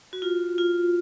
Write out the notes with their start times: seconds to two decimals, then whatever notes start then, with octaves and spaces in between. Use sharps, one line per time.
0.13 F#4
0.22 F4
0.58 F4